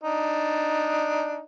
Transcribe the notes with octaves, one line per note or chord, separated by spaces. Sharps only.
D4 D#4